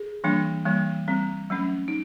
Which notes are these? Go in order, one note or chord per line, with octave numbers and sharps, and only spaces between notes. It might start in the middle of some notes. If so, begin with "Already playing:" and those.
Already playing: G#4
E3 G3 A#3 D4
E3 G3 A#3
G3 C4
F#3 A3 C#4
D#4